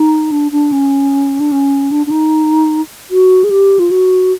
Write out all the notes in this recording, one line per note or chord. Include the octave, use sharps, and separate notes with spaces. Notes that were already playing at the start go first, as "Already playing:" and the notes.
Already playing: D#4
D4
D4
C#4
D4
C#4
D4
D4
D#4
F#4
G#4
G4
F4
F#4